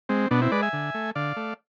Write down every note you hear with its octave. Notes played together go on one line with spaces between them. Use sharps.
G#3 C4
B2 B3 D4
C4 E4
G#3 B4 D5
E5 G#5
D3
A3
D3 D5 F5
A3